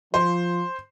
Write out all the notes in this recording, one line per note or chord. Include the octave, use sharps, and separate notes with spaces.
F3 C5